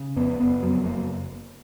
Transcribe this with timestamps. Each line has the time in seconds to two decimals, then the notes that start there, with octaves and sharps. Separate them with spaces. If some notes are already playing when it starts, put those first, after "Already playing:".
Already playing: C#3
0.16 F2 B3
0.39 F#1 B3
0.62 F2 F#3
0.85 F#1 A#3